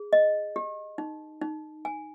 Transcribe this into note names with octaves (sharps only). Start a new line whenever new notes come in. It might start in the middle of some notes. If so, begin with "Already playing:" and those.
Already playing: G#4
D#5
G4
D#4
D#4
G#5